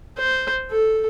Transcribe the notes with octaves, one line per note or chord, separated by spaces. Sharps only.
C5
A4